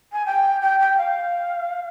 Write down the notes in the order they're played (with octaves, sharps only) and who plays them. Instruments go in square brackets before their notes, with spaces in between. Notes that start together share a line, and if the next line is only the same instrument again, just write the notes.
[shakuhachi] G#5
G5
G5
G5
F5